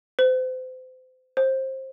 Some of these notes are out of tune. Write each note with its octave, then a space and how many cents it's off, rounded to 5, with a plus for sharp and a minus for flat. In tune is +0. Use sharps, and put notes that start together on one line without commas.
C5 -35
C5 +20